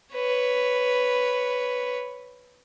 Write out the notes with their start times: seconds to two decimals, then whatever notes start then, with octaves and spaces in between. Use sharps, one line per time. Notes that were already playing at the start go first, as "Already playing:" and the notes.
0.14 B4 C#5